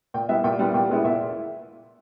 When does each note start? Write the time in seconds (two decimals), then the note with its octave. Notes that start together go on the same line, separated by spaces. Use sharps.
0.14 A#2 G5
0.29 G3 B3 E4 E5
0.44 A#2 G5
0.59 G3 B3 E4
0.74 A#2 G5
0.89 G#3 B3 E4
1.04 A#2 E5